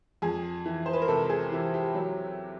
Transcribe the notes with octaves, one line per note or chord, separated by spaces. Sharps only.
F2 G#4
E3
C5
B4
A#4
C3 A4
G#4
E3 G4
G4
F#3